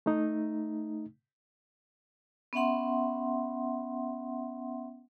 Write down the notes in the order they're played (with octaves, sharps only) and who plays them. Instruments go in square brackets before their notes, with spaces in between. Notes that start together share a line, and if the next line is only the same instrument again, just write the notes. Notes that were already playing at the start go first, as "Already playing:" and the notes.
[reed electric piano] A3 D#4
[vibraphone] B3 C#4 E5 F#5 C6